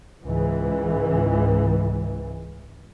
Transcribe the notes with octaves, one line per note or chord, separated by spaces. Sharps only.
C#2 G#2 E3